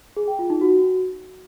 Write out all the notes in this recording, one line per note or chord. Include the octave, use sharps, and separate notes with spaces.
G#4
G5
F4
D#4
F#4